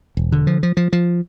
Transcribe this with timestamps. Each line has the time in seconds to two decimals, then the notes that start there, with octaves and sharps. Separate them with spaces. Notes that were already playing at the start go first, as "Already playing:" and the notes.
0.17 E1
0.32 D3
0.47 F3
0.63 F3
0.77 F3
0.93 F3